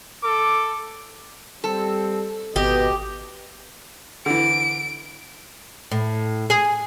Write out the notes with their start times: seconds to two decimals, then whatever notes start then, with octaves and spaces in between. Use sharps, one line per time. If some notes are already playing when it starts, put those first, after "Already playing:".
0.23 A4 D6
1.64 G3 C4 A4
2.56 G#1 B2 G4 D#5
4.26 D3 E3 D7
5.91 A2
6.50 G#4